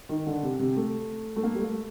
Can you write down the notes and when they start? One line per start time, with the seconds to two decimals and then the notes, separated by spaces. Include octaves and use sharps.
0.09 D#3
0.26 D3
0.43 C3
0.59 C3
0.76 A3
1.36 A3
1.43 A#3
1.55 G3
1.60 A3